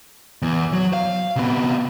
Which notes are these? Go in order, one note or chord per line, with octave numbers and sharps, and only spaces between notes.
E2
F#3
F5
C3 B3